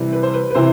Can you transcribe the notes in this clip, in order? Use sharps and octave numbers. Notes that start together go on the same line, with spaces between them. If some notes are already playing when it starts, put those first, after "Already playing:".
Already playing: C3 E3 G3
B4
C5
B4
B4
C3 E3 C5